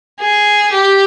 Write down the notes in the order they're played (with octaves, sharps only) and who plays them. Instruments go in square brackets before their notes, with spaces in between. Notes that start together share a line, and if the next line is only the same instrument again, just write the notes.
[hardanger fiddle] G#4
G4